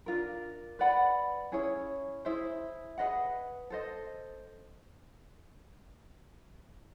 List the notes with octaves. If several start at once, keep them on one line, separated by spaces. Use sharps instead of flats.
D4 F4 A#4
B4 D5 F#5 B5
C#4 E4 G#4 C#5
E4 G#4 C5 E5
G#4 B4 D#5 F#5
A4 C5 D#5